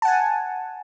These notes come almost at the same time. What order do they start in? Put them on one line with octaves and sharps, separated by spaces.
A5 F#5 G#5